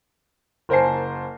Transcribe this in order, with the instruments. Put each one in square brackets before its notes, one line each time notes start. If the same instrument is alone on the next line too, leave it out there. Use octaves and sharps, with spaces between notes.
[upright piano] F#1 A#4 C5 G#5 A5 C7